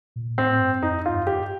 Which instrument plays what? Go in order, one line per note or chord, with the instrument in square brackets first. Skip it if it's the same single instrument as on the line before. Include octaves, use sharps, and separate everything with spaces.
[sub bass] A#2
[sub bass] A2 [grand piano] C4
[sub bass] G2
[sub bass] F2 [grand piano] D#4
[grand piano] F4
[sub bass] G2
[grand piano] G4